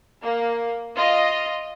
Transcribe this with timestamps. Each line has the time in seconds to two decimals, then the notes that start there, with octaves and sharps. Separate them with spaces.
0.22 A#3
0.96 F4 D#5